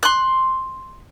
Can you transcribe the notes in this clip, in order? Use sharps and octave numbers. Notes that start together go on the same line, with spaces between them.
C6 F#6